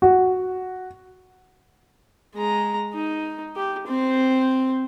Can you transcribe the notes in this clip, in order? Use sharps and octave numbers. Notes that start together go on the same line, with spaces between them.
F#4
G#3 A#5
D#4
G4
C4 C5